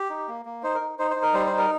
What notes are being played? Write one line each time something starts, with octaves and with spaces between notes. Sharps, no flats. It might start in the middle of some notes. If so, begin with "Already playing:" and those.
Already playing: G4
D#4
A#3
A#3
D#4 C5
A#4
D#4
D#4 C5
C5
D#4
A#4
G3 C5
C5
D#4
A#4